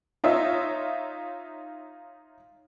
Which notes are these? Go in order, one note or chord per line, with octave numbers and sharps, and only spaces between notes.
D#4 F4 C#5 E5